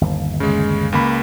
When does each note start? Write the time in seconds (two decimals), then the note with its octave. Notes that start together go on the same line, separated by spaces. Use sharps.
0.01 G1 D#2
0.40 C#3 G#3
0.92 C#2 A#3 B5